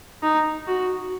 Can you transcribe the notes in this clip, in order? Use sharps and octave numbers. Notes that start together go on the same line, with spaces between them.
D#4
F#4